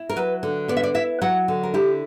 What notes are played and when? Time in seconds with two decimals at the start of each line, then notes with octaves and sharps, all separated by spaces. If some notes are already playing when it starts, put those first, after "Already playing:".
Already playing: E4
0.10 A#4
0.16 F#3 B4
0.43 D3
0.68 B3 D5
0.77 E5
0.83 D5
0.94 E4 E5
1.22 F#3 F#5
1.48 D3
1.63 A#4
1.74 E4 G4